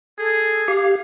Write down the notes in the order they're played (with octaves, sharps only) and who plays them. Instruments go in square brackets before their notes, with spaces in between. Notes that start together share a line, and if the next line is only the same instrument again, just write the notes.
[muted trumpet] G#4 [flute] A4
[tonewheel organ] G4 F5 [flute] D6